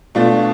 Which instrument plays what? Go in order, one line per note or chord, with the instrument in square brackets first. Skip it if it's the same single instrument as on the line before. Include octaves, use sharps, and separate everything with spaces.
[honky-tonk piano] B2 A3 D4 [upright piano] F4